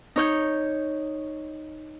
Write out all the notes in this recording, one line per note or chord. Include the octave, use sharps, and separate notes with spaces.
D#4 C#5 G6